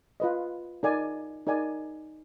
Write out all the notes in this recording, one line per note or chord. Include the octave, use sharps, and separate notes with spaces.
F4 B4 D#5
D#4 A#4 D5 G#5
D#4 A#4 D5 G#5